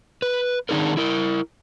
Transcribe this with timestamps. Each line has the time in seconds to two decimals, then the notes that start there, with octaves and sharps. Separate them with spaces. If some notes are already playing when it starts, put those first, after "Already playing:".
0.22 B4
0.69 D#3 D4 D#4 G#4 A#4
0.97 E4 A#4